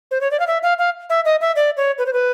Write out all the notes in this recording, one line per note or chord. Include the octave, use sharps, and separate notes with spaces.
C5
C#5
D5
F5
E5
F5
F5
E5
D#5
E5
D5
C#5
B4
C5
B4